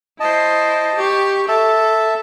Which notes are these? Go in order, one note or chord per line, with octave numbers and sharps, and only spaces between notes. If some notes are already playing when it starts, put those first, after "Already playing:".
E4 C5 D#5 A5
G4 C#6
A4 E5 A5